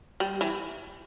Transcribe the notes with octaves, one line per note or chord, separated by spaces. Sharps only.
G3
E3